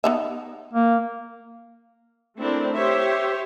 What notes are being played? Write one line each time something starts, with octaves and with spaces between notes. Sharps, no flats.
B3 D#4 E5
A#3
A3 C4 D4 E4 A#4
G4 C5 C#5 E5